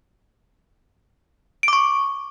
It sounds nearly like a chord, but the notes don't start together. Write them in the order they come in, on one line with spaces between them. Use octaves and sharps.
D7 D6 C#6